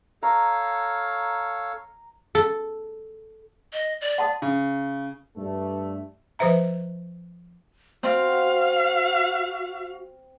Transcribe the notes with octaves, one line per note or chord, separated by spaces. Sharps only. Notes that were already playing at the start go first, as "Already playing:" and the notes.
A4 C#5 F5 A#5
A4
D#5
D5
F#5 A5 D#6
C#3
G2 A3
F3 B4 C5 E5 A#5
C4 F#4 F5